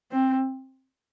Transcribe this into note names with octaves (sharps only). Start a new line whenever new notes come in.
C4